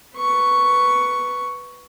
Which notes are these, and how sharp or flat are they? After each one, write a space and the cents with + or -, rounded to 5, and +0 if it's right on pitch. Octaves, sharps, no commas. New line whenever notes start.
B4 +0 C#6 +5